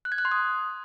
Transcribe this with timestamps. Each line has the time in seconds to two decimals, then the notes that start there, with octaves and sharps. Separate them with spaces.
0.05 F#6
0.12 G#6
0.18 F#6
0.25 C6
0.32 D#6